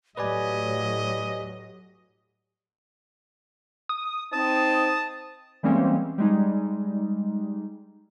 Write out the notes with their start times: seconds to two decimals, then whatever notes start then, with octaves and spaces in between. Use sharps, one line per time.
0.17 A2 F#3 G4 B4 D5 D#5 G#5
3.89 D#6
4.33 C4 D#4 C5 A5 D#6
5.63 E3 G3 G#3 A#3 C4 C#4
6.18 G3 G#3 D#4